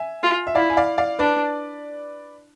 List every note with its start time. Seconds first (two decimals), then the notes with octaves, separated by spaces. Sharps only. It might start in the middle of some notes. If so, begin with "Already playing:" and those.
Already playing: E5 G#5
0.23 F4
0.47 E5
0.55 E4 D5 F5
0.70 G#5
0.77 D5 F5
0.98 D5 F5
1.19 D4 B4 D5